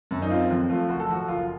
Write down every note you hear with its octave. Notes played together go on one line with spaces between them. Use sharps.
F#2
D#4
C4 F4
F2
A3 F4
F#1 F#4
A4
F3 F#4
F#1 F4